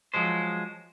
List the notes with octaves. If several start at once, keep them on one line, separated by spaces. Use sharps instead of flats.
F3 F#3 G#3 C5